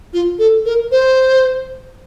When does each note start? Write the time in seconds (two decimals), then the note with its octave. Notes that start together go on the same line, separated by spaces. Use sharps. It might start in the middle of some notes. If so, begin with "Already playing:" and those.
0.13 F4
0.39 A4
0.66 A#4
0.92 C5